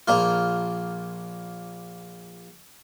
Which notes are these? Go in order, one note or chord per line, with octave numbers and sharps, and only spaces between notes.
A#1 A#3 F4